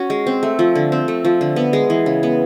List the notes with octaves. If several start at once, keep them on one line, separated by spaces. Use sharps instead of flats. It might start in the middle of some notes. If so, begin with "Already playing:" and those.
Already playing: C#4 F#4
G#3
C4
A3
F3
D3
C4
A3
F3
D3
B3
G#3
E3
C#3
B3